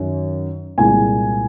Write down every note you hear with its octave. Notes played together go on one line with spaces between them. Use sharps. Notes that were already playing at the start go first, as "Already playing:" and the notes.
Already playing: F#2 D#3 F#3
C2 A#2 G#3 G#5